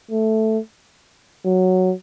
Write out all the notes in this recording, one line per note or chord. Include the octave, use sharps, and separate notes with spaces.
A3
F#3